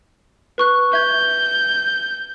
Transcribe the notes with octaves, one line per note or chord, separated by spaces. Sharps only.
B4 C#6 F#6
E5 G6 G#6